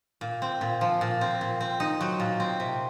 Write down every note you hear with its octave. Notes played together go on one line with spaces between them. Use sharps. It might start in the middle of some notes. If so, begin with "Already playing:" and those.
A#2
C4
A#2
F3
A#2
C4
A#2
C4
D#4
F#3
A#2
C4
C3